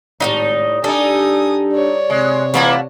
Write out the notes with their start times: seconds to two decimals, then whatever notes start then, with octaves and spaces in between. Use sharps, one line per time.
0.20 G#1 C#2 A2 F#3 G3 D#4
0.84 G3 D4 D#4 G4 A4 G#5 D#6
1.72 C#5 D5
2.10 C3 G#3
2.54 E3 A3 A#3 E4 F4 F#5